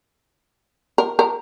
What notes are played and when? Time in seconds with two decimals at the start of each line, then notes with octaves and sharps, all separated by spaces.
0.98 A#4
1.19 A#4